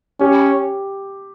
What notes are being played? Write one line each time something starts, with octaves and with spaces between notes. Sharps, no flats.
C#4 G4